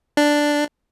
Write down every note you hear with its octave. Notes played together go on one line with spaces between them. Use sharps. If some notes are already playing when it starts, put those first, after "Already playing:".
D4